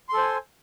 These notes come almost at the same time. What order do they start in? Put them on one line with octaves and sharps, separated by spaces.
C6 A4 C5 G#5